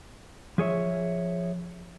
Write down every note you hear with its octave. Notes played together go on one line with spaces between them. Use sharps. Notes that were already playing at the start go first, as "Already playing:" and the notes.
F3 G#4 C#5 E5